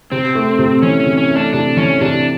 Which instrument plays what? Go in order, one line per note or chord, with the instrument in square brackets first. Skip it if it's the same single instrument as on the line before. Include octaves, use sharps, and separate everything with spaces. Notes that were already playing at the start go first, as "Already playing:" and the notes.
[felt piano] C3 [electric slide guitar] C4
[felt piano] A3
C3
[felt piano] E3 [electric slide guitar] C#4
[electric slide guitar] C#4
[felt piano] C3
[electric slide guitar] C#4
[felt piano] A3
[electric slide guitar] D4
[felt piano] C3 [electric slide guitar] D4
[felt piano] E3 [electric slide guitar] C#4
[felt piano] C3 [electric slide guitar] D4